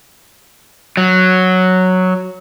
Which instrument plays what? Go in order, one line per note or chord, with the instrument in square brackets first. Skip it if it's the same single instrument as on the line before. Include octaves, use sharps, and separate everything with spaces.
[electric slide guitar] F#3